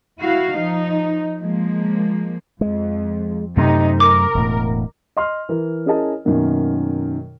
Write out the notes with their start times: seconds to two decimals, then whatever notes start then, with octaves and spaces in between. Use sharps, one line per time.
0.20 E4 F#4 F5
0.53 F3 D#4
1.39 F3 G#3 A#3
2.61 F2 G#3
3.57 F#2 C3 A3 D#4
4.00 A#4 D6
4.35 E1 A2
5.17 D#5 C6 F6
5.49 E3 A#4
5.86 C#4 E4 G#4 A#4 D#5 A5
6.25 F#2 B2 D#3 A#3